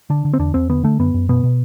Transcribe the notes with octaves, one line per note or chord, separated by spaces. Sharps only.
D3 D4
D3
C4
E2 D4
E2 C4
D3 B3
D3 A3
F#2 B3
F#2
B2 B3
B2